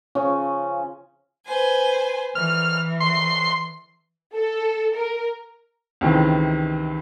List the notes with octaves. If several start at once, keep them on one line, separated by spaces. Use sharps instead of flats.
C#3 F3 C#4
B4 C5 G#5
E3 F6
C6
A4
A#4
C#2 C3 D#3 E3